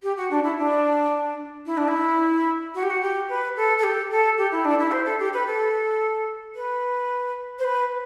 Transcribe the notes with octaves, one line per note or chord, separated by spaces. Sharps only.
G4
F#4
D4
E4
D4
E4
D4
E4
F#4
G4
F#4
G4
B4
A4
A4
G4
A4
G4
E4
D4
E4
C5
A4
G4
B4
A4
B4
C5
B4